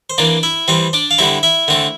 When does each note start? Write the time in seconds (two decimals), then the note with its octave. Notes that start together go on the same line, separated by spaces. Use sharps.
0.10 C5
0.18 E3 A#3 D4 D5
0.43 E4 E5
0.68 E3 G3 C4 C5
0.93 D4 D5
1.11 F5
1.18 D3 G3 C4 E4 E5
1.43 E4 E5
1.68 D3 A3 C4